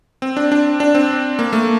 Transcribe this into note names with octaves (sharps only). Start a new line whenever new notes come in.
C4
D4
D4
D4
C4
A#3
A3